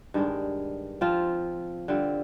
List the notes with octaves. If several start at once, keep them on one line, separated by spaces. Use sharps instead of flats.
G2 D#3 G#3 D4
F3 C4 F4
D3 G3 C4 F4